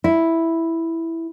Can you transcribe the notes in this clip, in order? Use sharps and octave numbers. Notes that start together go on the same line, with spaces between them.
E4